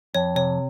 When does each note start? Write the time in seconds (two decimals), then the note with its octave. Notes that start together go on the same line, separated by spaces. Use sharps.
0.15 F2 C#5
0.35 C3 C#5